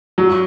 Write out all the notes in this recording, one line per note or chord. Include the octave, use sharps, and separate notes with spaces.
F#3